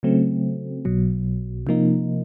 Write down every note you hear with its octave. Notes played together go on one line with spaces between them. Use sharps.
C#3 F#3 A3 C4
B1 B2 F#3
C3 F3 A#3 D#4